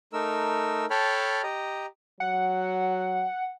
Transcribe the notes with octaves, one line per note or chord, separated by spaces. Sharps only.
A3 D#4 A#4 E6
A4 C#5 G5 A5 B5 F6
G4 D#5 A#5
F#3 F#5